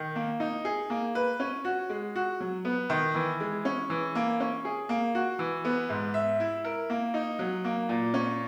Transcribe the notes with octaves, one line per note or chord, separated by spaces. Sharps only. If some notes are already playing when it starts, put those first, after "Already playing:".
Already playing: D#3
A#3
D#4
G#4
A#3
B4
C#4
F#4
G#3
F#4
F#3
B3
D#3
E3
G#3
C#4
E3
A#3
C#4
G#4
A#3
F#4
E3
B3
G#2
E5
E4
A#4
A#3
D#4
F#3
A#3
A#2
C#4